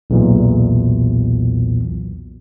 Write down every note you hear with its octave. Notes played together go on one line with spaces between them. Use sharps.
B1 E2 A#2